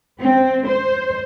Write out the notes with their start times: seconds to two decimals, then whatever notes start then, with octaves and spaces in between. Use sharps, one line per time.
0.19 C4
0.67 C5